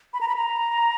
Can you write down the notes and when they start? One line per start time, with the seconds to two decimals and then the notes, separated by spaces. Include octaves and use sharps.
0.13 B5
0.21 A#5
0.28 B5
0.36 A#5